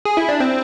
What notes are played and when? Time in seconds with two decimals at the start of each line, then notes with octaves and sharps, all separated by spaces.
0.05 G#4
0.17 E4
0.29 D4
0.40 C4